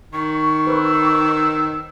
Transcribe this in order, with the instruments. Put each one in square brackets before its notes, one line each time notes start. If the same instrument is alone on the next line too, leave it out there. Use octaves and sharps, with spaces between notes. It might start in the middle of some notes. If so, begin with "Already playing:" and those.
[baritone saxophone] D#3 [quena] C#6
[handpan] B4 C5 [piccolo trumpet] E6